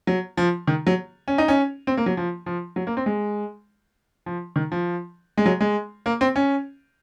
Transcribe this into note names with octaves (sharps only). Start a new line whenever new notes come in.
F#3
F3
D#3
F#3
C#4
D#4
C#4
C4
A#3
F#3
F3
F3
F#3
A#3
C4
G#3
F3
D#3
F3
G#3
F#3
G#3
A#3
C4
C#4